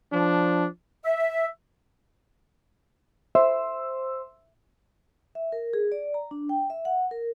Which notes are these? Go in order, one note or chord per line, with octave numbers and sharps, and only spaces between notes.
F3 D4
E5
C5 E5 C6 E6
E5
A#4
G#4
D5
A#5
D4
G5
E5
F#5
A#4